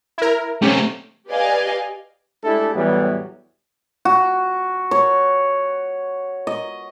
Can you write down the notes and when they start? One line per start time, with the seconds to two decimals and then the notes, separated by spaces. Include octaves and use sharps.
0.18 E4 A#4
0.62 A3 C4 C#4 G4
1.29 G4 B4 D5 D#5 F5 G#5
2.44 G#3 A3 D4 E4 G4 A4
2.75 E2 A2 E3 F#3 G3 B3
4.05 F#4
4.91 C#5
6.47 D#5